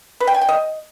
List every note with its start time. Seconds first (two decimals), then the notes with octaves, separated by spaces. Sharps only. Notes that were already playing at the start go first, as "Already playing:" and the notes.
0.20 B4
0.27 G5
0.34 G#5
0.41 G5
0.48 D#5